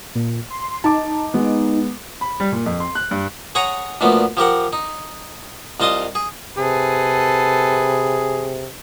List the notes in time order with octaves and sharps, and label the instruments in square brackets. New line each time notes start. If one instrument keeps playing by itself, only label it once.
[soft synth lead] A#2
C6
[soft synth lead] D#4 [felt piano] A5 D6
[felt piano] G#3 B3
[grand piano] B5
G3
A#2
F2
C6
F#6
G2
[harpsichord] G#4 C#5 F#5 G#5 A#5
D2 A#2 F3 A3 B3
F3 G4 A#4 F#5
D#4
C2 F4 D#5 A5 C6 D#6
G#4
[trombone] C3 [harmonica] G#4 [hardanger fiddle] A4 B4